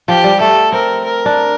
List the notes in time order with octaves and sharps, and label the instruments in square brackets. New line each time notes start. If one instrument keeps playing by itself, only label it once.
[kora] F3 [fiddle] G4
[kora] G3
[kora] A3 [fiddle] A4
[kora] C4 [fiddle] A#4
[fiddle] A#4
[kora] D4